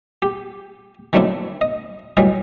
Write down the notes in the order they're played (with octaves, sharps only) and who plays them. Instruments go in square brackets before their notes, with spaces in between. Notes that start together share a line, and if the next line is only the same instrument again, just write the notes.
[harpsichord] G4
D#3 F#3 A3 C4 D4 E4
D#5
A2 E3 F#3 G3 D#5